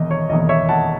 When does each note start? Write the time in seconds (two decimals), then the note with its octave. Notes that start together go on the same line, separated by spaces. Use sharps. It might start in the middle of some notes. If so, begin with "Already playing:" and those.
Already playing: E1 E2 D#3 D#5
0.11 C#5
0.30 E1 E2 D#3 D#5
0.49 C#5 E5
0.69 F#5 A5